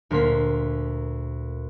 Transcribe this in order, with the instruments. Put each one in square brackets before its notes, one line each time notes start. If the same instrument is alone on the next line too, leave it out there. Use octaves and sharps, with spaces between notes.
[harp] D2 A#2 A#3 C6 B6